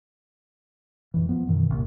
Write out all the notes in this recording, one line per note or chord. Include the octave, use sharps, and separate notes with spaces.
F2 E3
F3 B3
F#2 B2 D#3 E3
G1 C2 A#2